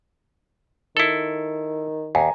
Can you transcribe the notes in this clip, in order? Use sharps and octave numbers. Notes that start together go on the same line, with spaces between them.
D#3 E4 A4
D#2 G#5 A#5